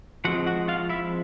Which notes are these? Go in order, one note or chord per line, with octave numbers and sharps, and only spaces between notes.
F3 G#3 C4 F#4 F#5
F#4 F#5
F4 F5
E4 E5